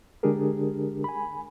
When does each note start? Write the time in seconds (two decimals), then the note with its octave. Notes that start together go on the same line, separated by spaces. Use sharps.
0.23 D3 G#3 D4 G4 G#4 A#4
1.04 G#5 B5